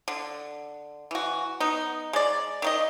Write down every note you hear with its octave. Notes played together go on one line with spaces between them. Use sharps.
D3
E3 F#4
B3 D#4
G#3 D5
D#3 D#4 D#5